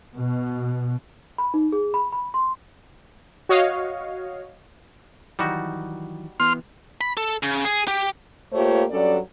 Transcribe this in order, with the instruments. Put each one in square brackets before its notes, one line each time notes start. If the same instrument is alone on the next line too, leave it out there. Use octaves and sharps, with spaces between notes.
[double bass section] B2
[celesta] B5
D#4
G#4
B5
B5
C6
[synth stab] F#4 C#5 D#5 F5
[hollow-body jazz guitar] D#3 E3 F#3 [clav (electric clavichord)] G3 D#4 F#4
[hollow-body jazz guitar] E3 B3 [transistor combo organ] C6 F6
[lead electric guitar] B5
A4
C#3
G#4
G4
[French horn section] A3 A#3 F4 G4 C5 C#5
G2 F#3 C#4 A4 D5